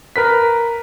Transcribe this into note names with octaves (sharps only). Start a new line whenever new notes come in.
A#4 B4 B6